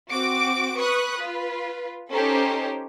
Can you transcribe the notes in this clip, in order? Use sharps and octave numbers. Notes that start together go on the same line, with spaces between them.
C4 F#4 D6 D7
B4 C#6 D#6 F#6
F4 B4
C#4 D#4 G4 A4 C5